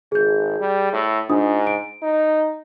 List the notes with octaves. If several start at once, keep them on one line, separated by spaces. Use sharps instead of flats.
G#1 G#4 G6
G3
A2
G#2 D4 F4 D#6
D7
D#4